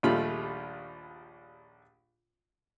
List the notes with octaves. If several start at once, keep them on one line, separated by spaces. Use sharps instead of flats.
A#1 D#2 G3 A3 F4 B5